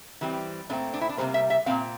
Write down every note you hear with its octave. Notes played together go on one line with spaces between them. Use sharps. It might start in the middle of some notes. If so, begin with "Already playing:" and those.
E3 G3 C4
A#2 A3 C4 D4
D4
E4
D4
C3 E3 G3 A#3 C5
E5
E5
A#2 A3 C4 F5